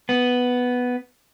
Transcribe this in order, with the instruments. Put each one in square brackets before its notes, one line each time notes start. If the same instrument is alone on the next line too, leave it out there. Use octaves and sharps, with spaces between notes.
[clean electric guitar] B3